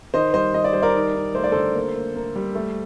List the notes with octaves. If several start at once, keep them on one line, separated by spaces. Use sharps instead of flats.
D#3 C5 D#5
G3 C5 D#5
D#3 D#5
D5
G3 C5
A#4 D5
D#4
D#4
A3 C5
D5
D3 A4 C5
A#3
A#3
A#3
G3
A3